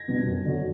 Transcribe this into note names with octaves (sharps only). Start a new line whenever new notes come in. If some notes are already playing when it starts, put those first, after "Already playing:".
Already playing: G#6 A#6
B2 G3 B3 D4
F#2
D3 F#3